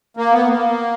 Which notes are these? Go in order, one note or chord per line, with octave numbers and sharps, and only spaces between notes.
A#3
B3
A#3